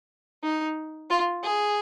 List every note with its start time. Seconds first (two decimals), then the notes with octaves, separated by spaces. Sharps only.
0.43 D#4
1.10 F4
1.44 G#4